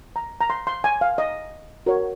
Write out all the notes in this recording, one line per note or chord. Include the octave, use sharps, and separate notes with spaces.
A#5
A#5
C6
C6
G#5
F5
D#5
F#4 A#4 C#5